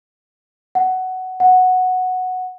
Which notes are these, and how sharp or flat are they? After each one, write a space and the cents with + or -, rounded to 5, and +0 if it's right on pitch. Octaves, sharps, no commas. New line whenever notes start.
F#5 +10
F#5 -5